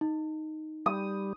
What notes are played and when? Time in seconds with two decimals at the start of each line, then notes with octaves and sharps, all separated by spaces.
0.01 D#4
0.86 G3 D#6